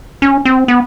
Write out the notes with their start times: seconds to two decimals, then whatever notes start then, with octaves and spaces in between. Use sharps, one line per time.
0.22 C#4
0.45 C4
0.68 B3